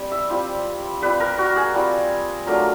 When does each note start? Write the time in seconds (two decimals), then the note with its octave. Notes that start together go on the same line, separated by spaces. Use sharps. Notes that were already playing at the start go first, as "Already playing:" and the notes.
Already playing: G3 C4
0.12 E5
0.30 G3 C4 F4
1.02 G3 C4 F4 B4
1.20 A#4
1.38 F#4
1.56 G#4
1.74 G3 C4 F4
2.46 F#3 A3 D4 F4 A#4